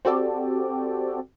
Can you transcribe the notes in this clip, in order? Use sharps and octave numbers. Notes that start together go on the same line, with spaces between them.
C4 F#4 G4 A4 D5